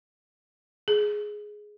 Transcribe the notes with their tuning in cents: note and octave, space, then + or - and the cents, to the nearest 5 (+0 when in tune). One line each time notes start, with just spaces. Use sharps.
G#4 +5